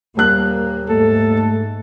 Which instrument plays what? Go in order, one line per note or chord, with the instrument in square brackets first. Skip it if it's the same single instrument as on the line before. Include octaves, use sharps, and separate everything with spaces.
[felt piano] D#1 F#6 [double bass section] A#3
[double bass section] G#2 [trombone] A3 [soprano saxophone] A4